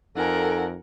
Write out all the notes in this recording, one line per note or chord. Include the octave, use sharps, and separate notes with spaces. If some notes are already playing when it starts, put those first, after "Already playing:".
F2 D#4 A4 A#4 F#5 G#5